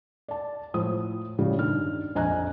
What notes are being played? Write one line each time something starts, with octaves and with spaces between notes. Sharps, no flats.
D5 A5
A2 F3 C5 D#6
A2 C#3 F3 G3
G2 D#3 F6
A#1 F2 D#5 G#5 A#5 F#6